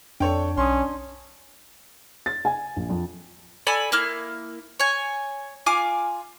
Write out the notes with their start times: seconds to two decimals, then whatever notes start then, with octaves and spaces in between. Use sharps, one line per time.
0.20 F2 D4 A4 C#5 G5
0.57 B1 C#4 C6 D#6
2.26 A6
2.45 G#5
2.76 A#1
2.90 F2
3.67 A4 D5 G#5 B5
3.92 A#3 E4 F6
4.80 C#5 G#5
5.66 F4 F5 G#5 D6